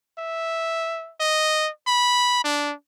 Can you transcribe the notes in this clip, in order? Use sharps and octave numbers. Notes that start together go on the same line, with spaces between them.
E5
D#5
B5
D4